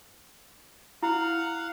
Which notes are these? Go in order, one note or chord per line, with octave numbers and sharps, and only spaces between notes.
E4 F5 F#5